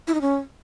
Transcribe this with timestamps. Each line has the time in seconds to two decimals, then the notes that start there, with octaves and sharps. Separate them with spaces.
0.07 E4
0.14 D#4
0.21 C#4